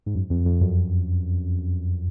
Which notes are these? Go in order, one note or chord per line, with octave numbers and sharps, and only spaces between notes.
G#2
F#2
F2
F2
F#2